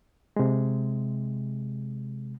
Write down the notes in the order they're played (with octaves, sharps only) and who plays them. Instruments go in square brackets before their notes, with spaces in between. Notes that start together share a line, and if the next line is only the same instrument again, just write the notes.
[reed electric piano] C3 G#3